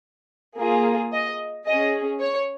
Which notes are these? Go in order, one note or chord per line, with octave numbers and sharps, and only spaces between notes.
A#3 F4 G#4
D#5
C#4 G#4 D#5
C#5